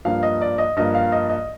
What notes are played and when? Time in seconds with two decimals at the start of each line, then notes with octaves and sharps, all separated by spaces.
0.05 G2 F3 A#3 F5
0.23 D#5
0.41 D5
0.58 D#5
0.76 G2 F3 A#3 D#5
0.95 F5
1.12 D#5
1.30 D#5